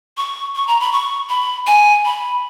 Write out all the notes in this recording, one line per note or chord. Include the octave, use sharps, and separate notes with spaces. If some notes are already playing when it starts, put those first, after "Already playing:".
C#6
C#6
A#5
B5
C#6
B5
G#5
B5